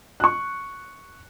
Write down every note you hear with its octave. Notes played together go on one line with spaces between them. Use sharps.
C#6 F#6